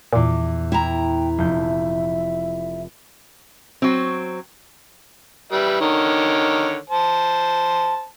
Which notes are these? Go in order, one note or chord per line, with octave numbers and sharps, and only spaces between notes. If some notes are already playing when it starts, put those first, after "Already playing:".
E2 A#2 D6
E4 G5 A#5
F1 E5 G6
F#3 C4
G3 B4 E5
D3 D#3 C#5
C5 A5